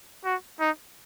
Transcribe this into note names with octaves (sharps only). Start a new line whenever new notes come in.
F#4
D#4